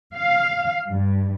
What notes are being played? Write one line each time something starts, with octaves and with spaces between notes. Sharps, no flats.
F5
G2